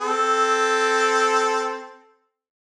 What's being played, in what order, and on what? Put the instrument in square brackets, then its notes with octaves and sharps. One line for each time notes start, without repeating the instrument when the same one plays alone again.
[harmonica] C4 A4